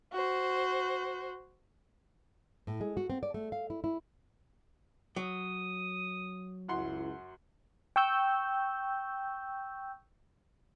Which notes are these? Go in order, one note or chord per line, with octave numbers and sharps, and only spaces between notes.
F#4 C5
A2
G#3
F#4
C4
D5
A3
F5
E4
E4
F#3 D#6
C#2 F#2 E4 F#5 C6
G5 C#6 E6 G6